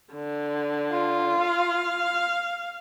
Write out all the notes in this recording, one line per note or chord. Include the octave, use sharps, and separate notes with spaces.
D3
F4
F5